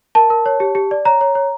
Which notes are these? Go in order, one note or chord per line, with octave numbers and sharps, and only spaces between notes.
A#4 A5
A#4
C#5
G4
G4
D5
C#5 A#5
C#5
C#5